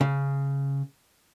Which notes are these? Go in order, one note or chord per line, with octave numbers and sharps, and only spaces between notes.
C#3